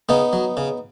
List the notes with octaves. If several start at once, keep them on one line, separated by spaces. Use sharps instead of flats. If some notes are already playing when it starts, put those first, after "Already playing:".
C#3 B3 D#4
F#3
C#3